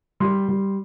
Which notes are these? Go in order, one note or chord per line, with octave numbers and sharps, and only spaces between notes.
G3 C6
G3